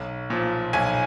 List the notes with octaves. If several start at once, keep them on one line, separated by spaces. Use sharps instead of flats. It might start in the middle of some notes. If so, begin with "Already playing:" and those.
Already playing: B1
A#2 F3
B1 G#5